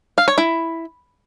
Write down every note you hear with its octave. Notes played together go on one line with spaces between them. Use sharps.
F5
C#5
E4